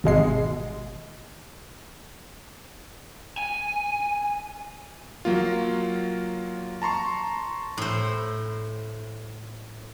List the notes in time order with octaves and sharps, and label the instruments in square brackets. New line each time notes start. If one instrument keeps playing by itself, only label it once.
[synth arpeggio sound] G#1 B2 G#3 C7
[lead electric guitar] G#5
[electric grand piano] F#3 A#3 F4
A5 A#5 C6 C#6
[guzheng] A2 C5